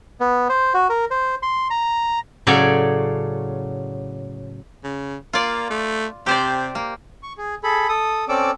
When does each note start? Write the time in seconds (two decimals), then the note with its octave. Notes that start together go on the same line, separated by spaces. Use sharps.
0.20 B3
0.49 C5
0.74 F#4
0.90 A#4
1.11 C5
1.43 C6
1.70 A#5
2.47 A2 C#3 F#3 A4 C#5 D5
4.84 C#3
5.33 A#3 F4 D5
5.70 A3
6.26 C3 G4 C5 D5
6.75 A#3
7.23 C#6
7.38 G#4
7.64 G#4 A4 B5
7.88 A4 D#6
8.29 C4 C#4 A4 D5 D6 E6